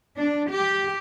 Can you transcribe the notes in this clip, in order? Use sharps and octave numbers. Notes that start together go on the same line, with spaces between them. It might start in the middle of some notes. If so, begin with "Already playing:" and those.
D4
G4